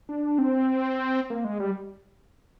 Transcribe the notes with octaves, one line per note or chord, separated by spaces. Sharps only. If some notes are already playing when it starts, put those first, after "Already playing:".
D4
C4
A#3
G#3
G3